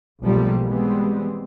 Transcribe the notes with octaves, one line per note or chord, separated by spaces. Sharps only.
B1 G#2 F3 G3 A3 A#3
E3 G3 G#3 B3 C4